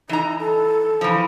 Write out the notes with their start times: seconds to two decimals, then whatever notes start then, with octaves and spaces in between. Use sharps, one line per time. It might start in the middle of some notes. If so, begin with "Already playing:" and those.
0.09 E3 D#4 A#5
0.39 A4
1.01 E3 F3